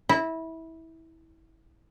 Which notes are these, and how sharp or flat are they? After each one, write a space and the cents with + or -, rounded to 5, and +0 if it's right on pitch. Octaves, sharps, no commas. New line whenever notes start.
E4 -20